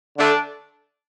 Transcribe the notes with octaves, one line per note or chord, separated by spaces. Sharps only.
D3 A3 D4